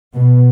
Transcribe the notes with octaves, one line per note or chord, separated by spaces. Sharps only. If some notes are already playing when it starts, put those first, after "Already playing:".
B2